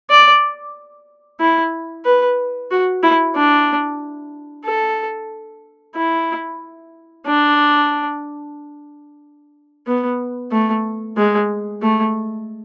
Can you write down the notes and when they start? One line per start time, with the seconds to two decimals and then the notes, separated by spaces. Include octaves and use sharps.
0.10 D5
1.40 E4
2.05 B4
2.71 F#4
3.03 E4
3.35 D4
4.66 A4
5.96 E4
7.26 D4
9.87 B3
10.52 A3
11.17 G#3
11.82 A3